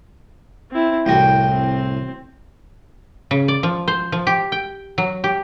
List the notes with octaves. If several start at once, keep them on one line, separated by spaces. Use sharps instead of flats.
C4 E4
C2 A2 F#4 G5
C4
C#3
D5
F3
C5
F3
G4
G5
F#3
G4